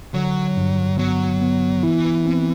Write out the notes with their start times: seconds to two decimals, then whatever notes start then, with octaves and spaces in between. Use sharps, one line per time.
0.14 D3 F#3
0.57 G2
0.98 F#3 B3
1.41 B3
1.83 E3 E4
2.26 C4